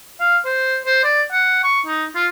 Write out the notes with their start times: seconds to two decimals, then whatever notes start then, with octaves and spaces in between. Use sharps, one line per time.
0.20 F5
0.45 C5
0.86 C5
1.04 D5
1.32 F#5
1.64 C#6
1.86 D#4
2.15 F4